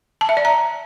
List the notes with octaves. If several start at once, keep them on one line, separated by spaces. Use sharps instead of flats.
A5
E5
D5
A#5